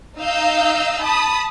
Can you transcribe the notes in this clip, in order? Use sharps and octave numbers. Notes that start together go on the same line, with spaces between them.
D#4 D#5 F5 E6 G6
A5 B5 D#6